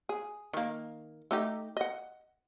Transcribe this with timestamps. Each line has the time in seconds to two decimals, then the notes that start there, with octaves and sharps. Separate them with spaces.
0.09 G#4
0.53 D#3 A#3
1.31 A3 D#4 G4
1.77 D#5 F#5